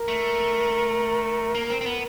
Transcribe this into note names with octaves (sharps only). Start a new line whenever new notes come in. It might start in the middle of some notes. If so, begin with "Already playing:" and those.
Already playing: A#4
A3
A#3
C4
C4
B3